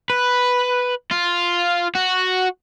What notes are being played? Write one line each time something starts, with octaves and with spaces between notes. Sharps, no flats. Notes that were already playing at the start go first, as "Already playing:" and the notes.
B4
F4
F#4